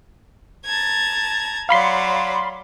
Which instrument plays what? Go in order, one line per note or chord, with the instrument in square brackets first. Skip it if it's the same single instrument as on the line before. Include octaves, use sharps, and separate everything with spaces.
[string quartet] A5 A#5 G#6
[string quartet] F#3 D5 [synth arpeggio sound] F5 B5 C6